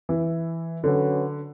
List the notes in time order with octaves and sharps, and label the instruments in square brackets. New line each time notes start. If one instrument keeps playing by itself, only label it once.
[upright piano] E3
[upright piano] D3 [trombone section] F#3 C#4 F#4 B4